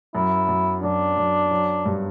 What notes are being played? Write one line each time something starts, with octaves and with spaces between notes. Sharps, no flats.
F#2 E4
F#2
F#2 D4
F#2
F#3
G2